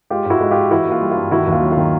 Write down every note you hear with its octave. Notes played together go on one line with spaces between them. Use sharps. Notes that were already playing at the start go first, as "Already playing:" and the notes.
G#3 F4 G4
G#2 E4 F#4
G#3
G#3 F4 G4
E3 E4 F#4
A#3
F4
G3
F4
G2
D#3 E4 F#4
D#2
F4
F#3
F4
D#3